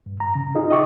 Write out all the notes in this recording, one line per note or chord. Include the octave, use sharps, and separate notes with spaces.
G2
A#5
C#3
D#4 F4 G#4 D#5
D#5 E5 G5 C#6 D6